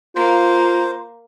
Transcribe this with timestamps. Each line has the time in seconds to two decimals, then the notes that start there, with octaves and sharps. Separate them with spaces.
0.16 A#3 F4 C5